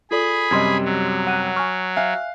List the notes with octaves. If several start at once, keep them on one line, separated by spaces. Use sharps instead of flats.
F4 G#4 A4 D5 B5
F#2 C3 G3 D#5 C6 G#6
F#3
F#5 F#6 D#7
G#5 C#6 F6
E5 F5 G#5 F#6